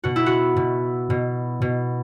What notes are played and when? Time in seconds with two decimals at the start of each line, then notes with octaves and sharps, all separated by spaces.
0.04 B2 F#4
0.16 E4
0.26 F#4
0.56 B2
1.10 B2
1.62 B2